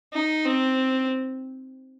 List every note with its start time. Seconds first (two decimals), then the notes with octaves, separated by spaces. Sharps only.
0.13 D#4
0.46 C4